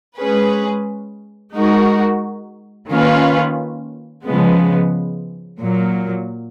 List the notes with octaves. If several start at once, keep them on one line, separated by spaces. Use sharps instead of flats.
G#3 C#4 G#4 B4
G#3 D#4 F#4 A#4
D#3 A#3 C#4 F4 B4
C#3 F3 G#3 B3
A#2 F#3 A#3